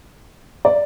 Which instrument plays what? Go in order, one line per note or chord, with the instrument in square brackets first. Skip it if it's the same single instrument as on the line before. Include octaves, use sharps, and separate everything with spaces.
[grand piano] D5